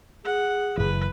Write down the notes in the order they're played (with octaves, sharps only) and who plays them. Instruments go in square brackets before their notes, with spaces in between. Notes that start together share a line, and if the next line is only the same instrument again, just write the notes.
[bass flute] G#4 [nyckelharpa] F#5
[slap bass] F#1 C#2 E3 [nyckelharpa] B4